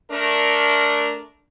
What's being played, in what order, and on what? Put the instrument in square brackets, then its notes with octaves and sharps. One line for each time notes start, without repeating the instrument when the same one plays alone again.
[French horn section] A3 D4 A#4